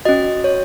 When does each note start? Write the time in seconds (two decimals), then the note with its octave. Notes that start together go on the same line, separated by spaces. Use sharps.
0.05 C#4 F#4 D#5
0.44 C#5